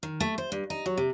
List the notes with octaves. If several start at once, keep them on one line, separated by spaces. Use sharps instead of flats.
D#3
A3
C5
G2
D#4
F#3
C3